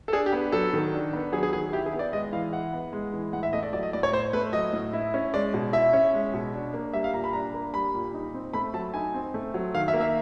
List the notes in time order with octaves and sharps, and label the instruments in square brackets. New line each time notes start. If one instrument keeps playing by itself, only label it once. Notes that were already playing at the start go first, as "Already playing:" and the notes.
[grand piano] A4
D4 G#4
G4
B3
F#3 A4
D#3
D4
B3
F#3 G#4
G#4
D#3 G#4
E4 G4
G#4
B3
D5
G#3 D#5
E3 F5
E4 F#5
B3
G#3
E3
A2 F#5
E5
A3 D#5
D5
F#3 D5
D#5
A2 D5
C#5
A2 C5
A3 B4
F#3 D#5
A2
E4
C#4
G#3 D5
B2
E4 E5
C#4
G#3
B2
D4
A#3
G3 E5
F5
A#2 A#5
B5
D4 A#5
A#3
G3 B5
A#2
D#4
C4
A3 B5
F#3 A5
D#4 G#5
C4
A3
F#3
D#3 F5
E5
A#3
E5